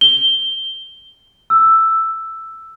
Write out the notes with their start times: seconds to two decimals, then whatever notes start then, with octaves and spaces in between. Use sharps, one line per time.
0.01 G7
1.50 E6